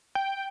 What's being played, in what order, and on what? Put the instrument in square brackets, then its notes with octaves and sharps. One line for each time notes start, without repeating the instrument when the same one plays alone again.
[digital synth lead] G5